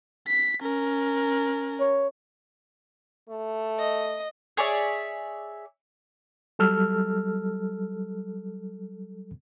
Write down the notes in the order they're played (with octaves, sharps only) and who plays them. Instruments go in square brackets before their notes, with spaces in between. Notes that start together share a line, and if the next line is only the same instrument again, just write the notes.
[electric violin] B6
C#4 A#4
[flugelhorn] C#5
[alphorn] A3
[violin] D#5
[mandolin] G#4 C#5 D5 E5
[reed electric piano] F#3 G3 A4 E6 F6